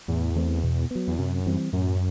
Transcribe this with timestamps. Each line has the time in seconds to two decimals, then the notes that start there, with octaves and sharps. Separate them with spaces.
0.08 E2 A2
0.36 E3 A3 C4
0.63 B2
0.91 F#3 B3
1.08 E2
1.18 F#2 C3
1.46 E3 G3 C4
1.73 F#2 A2